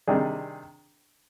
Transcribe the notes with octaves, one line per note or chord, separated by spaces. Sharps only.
C3 D#3 G3 D4 G#4